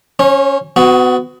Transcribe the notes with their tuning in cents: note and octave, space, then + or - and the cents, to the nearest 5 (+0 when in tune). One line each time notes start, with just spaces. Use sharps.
C#4 +0 C#5 -45
B3 +35 F#4 +0